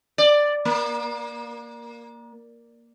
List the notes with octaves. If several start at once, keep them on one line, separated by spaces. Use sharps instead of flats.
D5
A#3